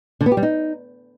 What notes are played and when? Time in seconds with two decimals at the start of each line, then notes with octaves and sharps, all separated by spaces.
0.21 D3
0.26 B3
0.32 G4
0.37 G3
0.43 D#4